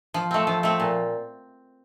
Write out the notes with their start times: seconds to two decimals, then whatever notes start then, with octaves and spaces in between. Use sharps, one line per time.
0.14 F3
0.31 A3 C4
0.47 F3
0.63 A3 C4
0.80 A#2